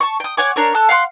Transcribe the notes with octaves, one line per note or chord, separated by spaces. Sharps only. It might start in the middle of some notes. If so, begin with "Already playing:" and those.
A5 C#6
G5 D#6
C#5 F#5 G#5 D6
D4 A#4 C#5
A4 A5 F#6
F5 F#5 C6